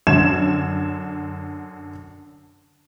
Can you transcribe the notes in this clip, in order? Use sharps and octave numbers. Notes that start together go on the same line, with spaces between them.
F#2 D3 G#6 E7